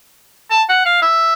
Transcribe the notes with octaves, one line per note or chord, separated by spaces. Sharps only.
A5
F#5
F5
E5